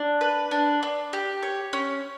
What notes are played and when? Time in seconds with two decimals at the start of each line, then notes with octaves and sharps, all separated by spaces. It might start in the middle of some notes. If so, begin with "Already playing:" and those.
Already playing: D4
0.21 B4
0.51 D4
0.83 D4
1.13 G4
1.43 C#5
1.73 C#4